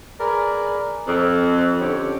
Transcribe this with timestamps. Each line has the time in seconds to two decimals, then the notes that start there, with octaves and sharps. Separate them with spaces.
0.20 G#4 A#4 B4 D5
1.07 F2
1.81 D3 C#4 G4 C#5